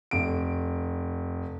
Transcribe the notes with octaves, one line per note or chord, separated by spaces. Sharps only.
F1 D7